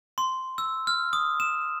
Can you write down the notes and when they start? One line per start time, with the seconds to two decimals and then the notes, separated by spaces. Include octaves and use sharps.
0.18 C6
0.58 E6
0.87 F6
1.13 D#6
1.40 E7